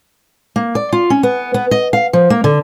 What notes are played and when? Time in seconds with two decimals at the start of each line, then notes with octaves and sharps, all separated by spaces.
0.56 A#3
0.75 D5
0.93 F4
1.10 C#4
1.23 B3
1.54 B3
1.71 D#5
1.93 F5
2.13 F3
2.30 A#3
2.44 D3